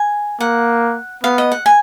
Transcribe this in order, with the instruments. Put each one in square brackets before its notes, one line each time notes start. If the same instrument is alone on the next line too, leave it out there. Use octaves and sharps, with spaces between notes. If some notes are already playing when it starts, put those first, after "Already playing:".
Already playing: [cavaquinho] G#5
[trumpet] A#3 [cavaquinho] F#5
[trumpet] B3 [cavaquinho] F5
[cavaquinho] D#5
F#5
G#5